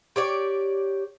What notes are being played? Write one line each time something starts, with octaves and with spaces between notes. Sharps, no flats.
G4 C#5 D5